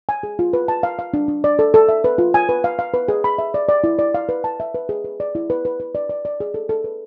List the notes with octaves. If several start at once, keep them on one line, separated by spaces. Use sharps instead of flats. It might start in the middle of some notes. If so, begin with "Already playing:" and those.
G#5
G#4
F4
B4
A5
F5
F5
D4
D4
D5
A4
A4
E5
B4
F4
G#5
B4
F5
F5
B4
G#4
B5
E5
D5
D5
E4
D5
F5
B4
A5
E5
B4
G#4
B4
D5
E4
B4
B4
B4
D5
D5
D5
G#4
A4
A4
B4